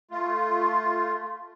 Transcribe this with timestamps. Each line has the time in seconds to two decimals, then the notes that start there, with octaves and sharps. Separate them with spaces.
0.11 A3 F4